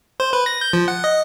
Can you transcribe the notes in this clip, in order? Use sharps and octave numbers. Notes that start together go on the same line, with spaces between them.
C5
B4
A#6
G6
F3
F#5
D#5